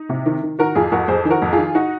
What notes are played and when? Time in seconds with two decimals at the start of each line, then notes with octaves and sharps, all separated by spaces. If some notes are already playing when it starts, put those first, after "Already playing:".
Already playing: D#4
0.09 C3
0.26 D#3
0.43 D#3
0.59 D#3 F#4 A#4
0.75 F2 F4 G#4
0.92 F2 F#4 A#4
1.08 F2 G#4 C5
1.25 D#3
1.30 F#4 A#4
1.42 F2
1.52 F4 G#4
1.58 D#3
1.75 D#4 F#4